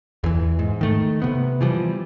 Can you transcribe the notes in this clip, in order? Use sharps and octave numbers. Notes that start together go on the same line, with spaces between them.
E2 E3
G#2
D#3 A3
C3 B3
E3 F3 G3